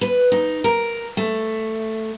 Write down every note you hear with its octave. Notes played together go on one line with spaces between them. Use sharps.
B4
D#4
A#4
A3